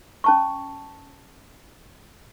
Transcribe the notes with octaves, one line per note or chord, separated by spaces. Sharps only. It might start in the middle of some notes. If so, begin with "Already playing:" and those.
C#4 A5 C#6